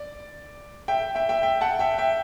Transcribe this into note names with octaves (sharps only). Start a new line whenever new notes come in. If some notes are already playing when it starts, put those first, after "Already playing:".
Already playing: D5
E5 G5
E5 G5
E5 G5
E5 G5
F#5 A5
E5 G5
E5 G5